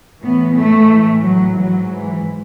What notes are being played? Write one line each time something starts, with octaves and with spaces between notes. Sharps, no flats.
A2 E3 B3
A3
A2 E3
F#3
G#2 E3 F#3
E3